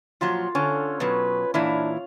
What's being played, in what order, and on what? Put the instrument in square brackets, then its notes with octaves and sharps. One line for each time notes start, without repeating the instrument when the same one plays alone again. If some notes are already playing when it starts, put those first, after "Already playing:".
[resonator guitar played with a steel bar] A#2 F3 F#3 [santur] F4
[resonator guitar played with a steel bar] D3 [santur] C#4 [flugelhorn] A4
[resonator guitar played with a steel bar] B2 F#3 [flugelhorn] B4
[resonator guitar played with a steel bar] A#2 E3 E4 [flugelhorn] D4 [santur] F5